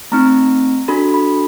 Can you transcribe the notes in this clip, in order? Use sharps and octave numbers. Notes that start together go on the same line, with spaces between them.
A3 C4 D#4 A#5
D4 F#4 A4 B5
B5